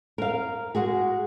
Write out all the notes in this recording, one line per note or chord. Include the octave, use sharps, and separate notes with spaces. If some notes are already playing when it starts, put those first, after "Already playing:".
A#4 F5
G#3 F#4 G#4